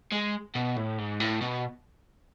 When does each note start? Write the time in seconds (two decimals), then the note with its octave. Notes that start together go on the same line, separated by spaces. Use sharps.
0.12 G#3
0.55 B2
0.76 A2
0.98 G#2
1.20 A2
1.42 B2